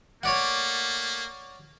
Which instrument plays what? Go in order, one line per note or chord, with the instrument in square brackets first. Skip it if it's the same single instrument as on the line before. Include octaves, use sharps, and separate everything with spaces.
[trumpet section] A3 A#3 [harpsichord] C#5 D5 F#5